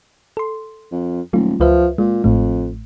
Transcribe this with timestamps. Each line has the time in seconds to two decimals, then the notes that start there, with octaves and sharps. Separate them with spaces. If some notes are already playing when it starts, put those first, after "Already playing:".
0.37 A4 C6
0.92 F2
1.33 D#1 F#3 A3 F4
1.60 C#2 F3 B4 E5
1.98 A#2 G#3
2.24 A1 F2 A2 A3